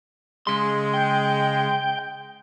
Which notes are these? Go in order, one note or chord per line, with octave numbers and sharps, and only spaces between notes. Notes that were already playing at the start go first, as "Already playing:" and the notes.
C#3 G#3 C6
G5